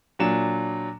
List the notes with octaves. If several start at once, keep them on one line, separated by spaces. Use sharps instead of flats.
A#2 F#3 D4 E7